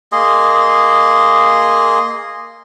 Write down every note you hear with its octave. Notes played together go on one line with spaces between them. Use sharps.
A#3 G#4 D#5 C6